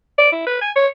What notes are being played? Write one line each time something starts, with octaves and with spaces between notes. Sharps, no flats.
D5
E4
B4
G#5
C#5